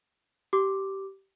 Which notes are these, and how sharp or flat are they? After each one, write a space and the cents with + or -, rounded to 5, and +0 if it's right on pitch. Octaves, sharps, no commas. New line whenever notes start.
G4 -15 D6 +0